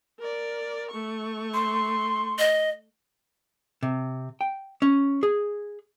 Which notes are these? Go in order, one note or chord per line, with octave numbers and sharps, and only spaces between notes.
A#4 D5
A3 C#6
C6
D#5
C3
G5
C#4
G#4